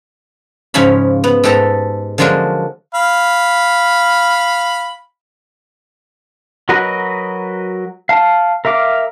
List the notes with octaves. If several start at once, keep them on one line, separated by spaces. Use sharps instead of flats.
G#2 C#3 F3 C#5 F5 B5
B3
G#2 G4 A4 A5 A#5
D3 F3 F#3 G#3 A#3 D4
F5 B5
F#3 F#4 A#4 B4 D#5
F5 A5
A#4 E5 F5 D6